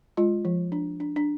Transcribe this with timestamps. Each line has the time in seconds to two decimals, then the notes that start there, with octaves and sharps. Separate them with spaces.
0.17 G#3 F4
0.45 F3
0.72 D4
1.00 D4
1.16 D4